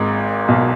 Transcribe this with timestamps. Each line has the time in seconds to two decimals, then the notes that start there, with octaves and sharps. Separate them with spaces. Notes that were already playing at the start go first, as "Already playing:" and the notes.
Already playing: G#1 G#2
0.48 B1 B2